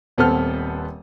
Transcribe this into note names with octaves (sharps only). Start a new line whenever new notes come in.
D#1 B3 C4 A4 B4 F6